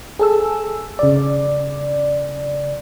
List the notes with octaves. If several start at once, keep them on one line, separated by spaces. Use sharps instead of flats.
G#4 A4 E6
C#3 D5